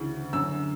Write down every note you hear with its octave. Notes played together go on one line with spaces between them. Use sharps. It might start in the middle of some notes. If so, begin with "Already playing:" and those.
Already playing: D2 C#3 E3
F#2 D3 E6